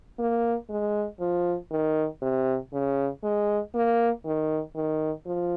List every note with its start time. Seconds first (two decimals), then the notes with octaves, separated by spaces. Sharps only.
0.19 A#3
0.70 G#3
1.20 F3
1.71 D#3
2.22 C3
2.73 C#3
3.23 G#3
3.74 A#3
4.25 D#3
4.76 D#3
5.26 F3